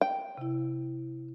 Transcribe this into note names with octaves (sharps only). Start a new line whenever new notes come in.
G5
C3 E4